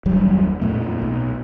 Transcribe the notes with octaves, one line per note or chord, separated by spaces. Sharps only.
F#1 D#2 F#3 G3
F2 A#2 A3
B1